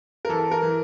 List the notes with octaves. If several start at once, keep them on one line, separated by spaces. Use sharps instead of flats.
A#4
E3 A4
A#4
E3